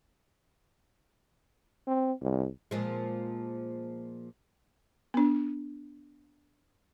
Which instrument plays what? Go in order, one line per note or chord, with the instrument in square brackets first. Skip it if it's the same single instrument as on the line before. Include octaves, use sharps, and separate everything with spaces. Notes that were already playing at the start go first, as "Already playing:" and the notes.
[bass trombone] C4
C2
[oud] A#2 F3 G#3
[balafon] B3 D4